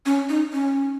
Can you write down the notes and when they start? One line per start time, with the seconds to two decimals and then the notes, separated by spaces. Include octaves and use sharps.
0.06 C#4
0.29 D#4
0.53 C#4